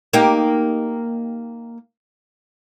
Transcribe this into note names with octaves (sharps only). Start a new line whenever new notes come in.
A#3 D#4 G4